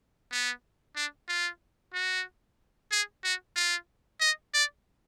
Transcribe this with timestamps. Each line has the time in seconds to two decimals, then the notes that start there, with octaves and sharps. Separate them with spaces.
0.31 B3
0.96 D4
1.29 F4
1.93 F#4
2.91 G#4
3.24 F#4
3.56 F4
4.21 D#5
4.54 D5